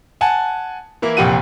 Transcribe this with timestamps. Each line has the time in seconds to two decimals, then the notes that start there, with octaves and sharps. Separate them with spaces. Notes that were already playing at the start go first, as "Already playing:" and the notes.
0.21 F#5 G#5 A5
1.02 E3 A#3 E4
1.17 F1 A#1 G4 F#5 D#7